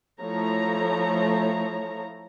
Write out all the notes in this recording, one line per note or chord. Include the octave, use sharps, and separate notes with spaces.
F3 A3 E4 C#5 A#5